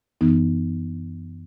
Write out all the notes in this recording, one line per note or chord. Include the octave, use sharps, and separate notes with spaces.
F#2 E3 B3 D#4